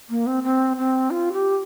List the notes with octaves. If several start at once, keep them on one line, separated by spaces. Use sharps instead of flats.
A#3
C4
C4
C4
F4
G4